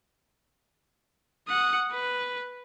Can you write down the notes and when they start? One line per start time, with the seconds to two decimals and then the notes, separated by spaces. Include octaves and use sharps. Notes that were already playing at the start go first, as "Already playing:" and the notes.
1.48 F#5 D#6
1.91 B4